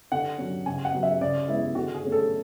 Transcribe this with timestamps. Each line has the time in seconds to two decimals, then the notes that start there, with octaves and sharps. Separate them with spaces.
0.12 D3 F#5
0.38 F#3 C#4
0.66 C#3 G#5
0.85 F#5
0.93 F#3 C#4
1.03 E5
1.21 C#3 D5
1.48 G#3 B3 E4
1.75 D3 F#4
1.94 G#4
2.03 A3 C#4
2.12 A4